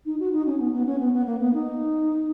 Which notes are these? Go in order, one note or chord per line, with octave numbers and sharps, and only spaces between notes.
D#4
F#4
D#4
C#4
B3
B3
C#4
B3
B3
A#3
B3
D#4